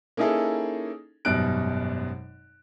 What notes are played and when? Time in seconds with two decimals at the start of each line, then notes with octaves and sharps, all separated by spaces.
0.17 A#3 C#4 D#4 E4 G#4 A4
1.25 G#1 F#2 B2 G3 F#6 D7